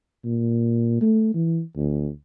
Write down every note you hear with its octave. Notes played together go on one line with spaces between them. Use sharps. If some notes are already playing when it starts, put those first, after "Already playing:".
A#2
A3
E3
D2